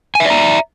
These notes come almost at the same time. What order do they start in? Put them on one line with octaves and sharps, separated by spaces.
G#5 E5 D5 A#5